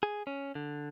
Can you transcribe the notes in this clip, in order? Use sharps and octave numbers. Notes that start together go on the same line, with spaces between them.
G#4
C#4
D3